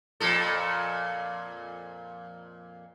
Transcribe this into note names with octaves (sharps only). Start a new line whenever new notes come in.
F2 A#2 A4